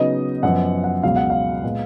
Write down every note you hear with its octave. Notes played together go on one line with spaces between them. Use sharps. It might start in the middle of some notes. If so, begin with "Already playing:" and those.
Already playing: C#3 F#3 B3 D#4 D#5
F#2 F3 B3 F#5
F#5
C#2 B2 F#3 F5
F#5
F5
A#2 G#3 B3